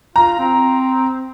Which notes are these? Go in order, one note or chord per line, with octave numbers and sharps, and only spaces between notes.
F4 A#5
C4